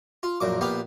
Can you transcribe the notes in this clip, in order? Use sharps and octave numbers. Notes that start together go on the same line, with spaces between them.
F4
A#1 F#2 A#2 D6
A#1 B3 G4 F5